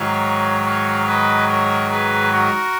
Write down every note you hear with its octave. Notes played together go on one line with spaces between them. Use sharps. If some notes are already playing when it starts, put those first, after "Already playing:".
Already playing: G#2 D#3 F#3 C#5 F5
C#5 F5
B4 D#5
A#4 C#5
G#4 B4
F#4 A#4